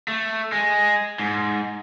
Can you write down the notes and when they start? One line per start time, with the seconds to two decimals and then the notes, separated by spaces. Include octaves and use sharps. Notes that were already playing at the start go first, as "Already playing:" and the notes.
0.08 A3
0.52 G#3
1.20 G#2